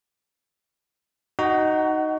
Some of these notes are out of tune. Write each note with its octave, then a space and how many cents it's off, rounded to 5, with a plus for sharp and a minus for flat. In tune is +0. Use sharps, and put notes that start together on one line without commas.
D#4 +0 F#4 +15 F#5 +35